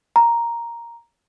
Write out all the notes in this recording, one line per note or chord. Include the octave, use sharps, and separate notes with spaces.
A#5